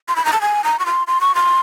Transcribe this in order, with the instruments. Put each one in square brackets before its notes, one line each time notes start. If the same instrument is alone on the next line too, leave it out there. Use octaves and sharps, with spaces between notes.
[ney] C6
B5
A#5
A5
G#5
A#5
C#6
C6
C6
C#6
C6